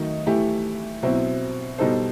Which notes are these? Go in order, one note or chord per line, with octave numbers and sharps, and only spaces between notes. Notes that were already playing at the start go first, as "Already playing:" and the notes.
Already playing: D#3 F#3 A3 D#4
E3 A3 E4 G4
B2 F#3 C4 E4
B2 G3 D#4 A4 C5